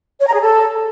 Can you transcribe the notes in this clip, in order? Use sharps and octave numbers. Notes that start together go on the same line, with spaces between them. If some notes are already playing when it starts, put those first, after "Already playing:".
C#5
A#5
G#4
A4